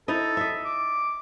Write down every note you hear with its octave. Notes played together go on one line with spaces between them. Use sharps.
D#4 E4 A4 D#5
D#5 E5
D6